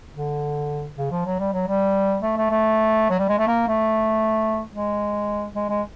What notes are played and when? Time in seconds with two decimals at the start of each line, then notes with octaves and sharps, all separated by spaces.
0.14 D3
0.97 C#3
1.11 F3
1.26 F#3
1.39 G3
1.53 F#3
1.67 G3
2.23 A3
2.37 A3
2.50 A3
3.10 F#3
3.19 G3
3.29 G#3
3.38 A3
3.47 A#3
3.68 A3
4.72 G#3
5.56 G#3
5.69 G#3